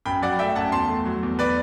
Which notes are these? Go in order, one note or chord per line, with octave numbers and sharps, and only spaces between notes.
F#2 G5 B5
F#3 D5 F#5
A3 E5 G5
F#2 F#5 A5
E2 A5 C6
A3
F#3
E2
B4 D5